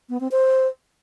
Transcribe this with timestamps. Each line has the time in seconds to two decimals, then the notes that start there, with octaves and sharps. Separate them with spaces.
0.09 B3
0.20 C4
0.31 C5